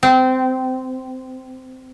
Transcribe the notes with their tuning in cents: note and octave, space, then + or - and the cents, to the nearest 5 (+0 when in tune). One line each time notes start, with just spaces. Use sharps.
C4 -20